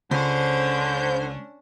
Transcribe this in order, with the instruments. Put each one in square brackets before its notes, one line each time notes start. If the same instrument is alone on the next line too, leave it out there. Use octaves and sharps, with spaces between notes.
[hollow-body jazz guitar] C#2 [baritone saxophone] D3 [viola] C#4 D4 [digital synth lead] C5